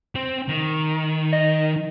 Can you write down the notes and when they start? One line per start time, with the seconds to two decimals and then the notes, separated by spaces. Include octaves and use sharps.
0.15 C4 C5
0.49 D#3
1.33 D#5